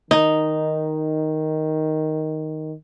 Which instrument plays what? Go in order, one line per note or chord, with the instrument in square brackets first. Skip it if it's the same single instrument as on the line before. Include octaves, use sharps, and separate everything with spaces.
[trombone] D#3 [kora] D#4